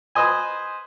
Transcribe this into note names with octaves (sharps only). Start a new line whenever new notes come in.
B4 C5 D#5 G#5